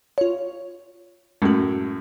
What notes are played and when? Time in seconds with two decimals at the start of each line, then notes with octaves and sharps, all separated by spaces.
0.18 F4 C#5
1.42 F#2 A2 G#3 F#4